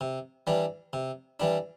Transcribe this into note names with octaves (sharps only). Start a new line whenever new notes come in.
C3
E3 G3 D4
C3
E3 G3 D4